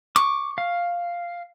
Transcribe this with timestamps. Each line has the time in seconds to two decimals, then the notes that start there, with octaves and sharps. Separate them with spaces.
0.16 C#6 D6
0.58 F5